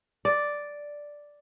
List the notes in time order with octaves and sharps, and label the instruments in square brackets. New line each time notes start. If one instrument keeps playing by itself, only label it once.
[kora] D5